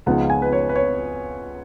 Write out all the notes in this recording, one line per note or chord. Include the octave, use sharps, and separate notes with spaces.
C#2 C#3 F3 B3 D#4 F#5
G#5
B4
C#5
B4
C#5